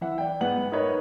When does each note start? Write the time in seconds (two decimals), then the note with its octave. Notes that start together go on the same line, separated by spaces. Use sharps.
0.01 E3 E5 F#5
0.18 D5 G5
0.41 G#2 B3 B4 F#5 F#7
0.72 D#4 A#4 B4 C#5 D#5